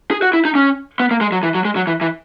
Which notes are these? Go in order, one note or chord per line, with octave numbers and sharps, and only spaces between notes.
G#4
F#4
E4
D#4
C#4
B3
A#3
G#3
F#3
E3
F#3
G#3
F#3
E3
E3